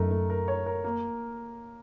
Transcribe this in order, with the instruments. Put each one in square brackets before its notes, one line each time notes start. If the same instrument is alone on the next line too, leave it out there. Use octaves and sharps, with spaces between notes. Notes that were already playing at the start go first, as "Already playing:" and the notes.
Already playing: [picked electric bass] F#2 [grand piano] A3 D#4 A#4
[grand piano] A3
A#4
C#5
A#4
A#3